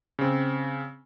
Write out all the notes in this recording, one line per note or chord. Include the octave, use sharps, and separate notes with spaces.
C#3 C4